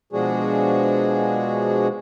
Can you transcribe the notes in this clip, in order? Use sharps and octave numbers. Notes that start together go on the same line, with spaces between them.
B2 F3 G#3 D4 F#4 G#4